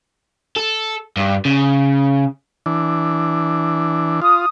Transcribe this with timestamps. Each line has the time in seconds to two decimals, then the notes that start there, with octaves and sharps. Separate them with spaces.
0.56 A4
1.17 G2
1.45 C#3
2.66 E3 D4
4.22 F4 D#6